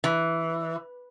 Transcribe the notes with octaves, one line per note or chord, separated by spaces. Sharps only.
E3